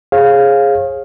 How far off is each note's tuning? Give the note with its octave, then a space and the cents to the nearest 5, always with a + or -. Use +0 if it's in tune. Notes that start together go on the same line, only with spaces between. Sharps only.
G#4 +0 C#5 -40 F5 +0